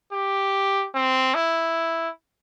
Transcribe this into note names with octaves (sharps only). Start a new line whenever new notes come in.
G4
C4
E4